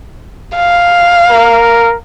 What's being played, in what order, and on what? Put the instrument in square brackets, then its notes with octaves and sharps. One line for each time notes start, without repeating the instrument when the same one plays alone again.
[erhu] F5
[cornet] A#4